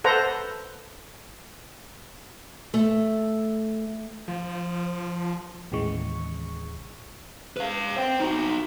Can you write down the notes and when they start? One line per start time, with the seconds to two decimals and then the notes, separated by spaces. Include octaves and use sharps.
0.04 A4 B4 C5 F#5 A#5
2.74 A3
4.28 F3
5.72 A1 D#2 C#3 E3 G#3 C#6
7.57 B4 F5
7.97 C5 G5
8.20 D#4 F#4